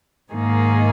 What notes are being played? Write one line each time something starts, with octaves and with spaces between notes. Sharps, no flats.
G#2 D#3 A#3 D#4 G#4